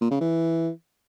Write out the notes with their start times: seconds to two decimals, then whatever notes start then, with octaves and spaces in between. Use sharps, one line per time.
0.01 A#2
0.11 C#3
0.20 E3